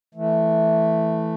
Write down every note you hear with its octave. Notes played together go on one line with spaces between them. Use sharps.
E3 A3